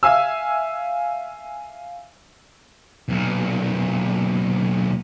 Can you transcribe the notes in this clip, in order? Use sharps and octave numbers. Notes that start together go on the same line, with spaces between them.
E5 F5 G#5 E6
B1 A#2